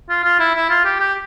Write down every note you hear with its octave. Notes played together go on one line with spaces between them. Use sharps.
F4
F4
E4
E4
F4
G4
G4